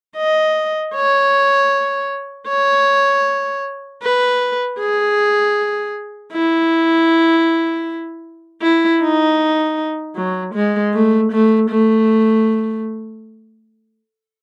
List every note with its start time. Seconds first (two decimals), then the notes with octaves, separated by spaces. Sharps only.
0.17 D#5
0.95 C#5
2.48 C#5
4.02 B4
4.79 G#4
6.32 E4
8.62 E4
9.02 D#4
10.16 F#3
10.54 G#3
10.94 A3
11.32 A3
11.70 A3